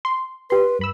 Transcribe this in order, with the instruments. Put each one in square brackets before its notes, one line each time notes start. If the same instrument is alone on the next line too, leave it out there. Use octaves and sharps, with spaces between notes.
[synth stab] C6
[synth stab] G4 C6 [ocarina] B4
[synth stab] G2 B5 E6